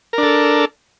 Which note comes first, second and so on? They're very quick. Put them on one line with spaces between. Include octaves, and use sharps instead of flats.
A#4 D4 A4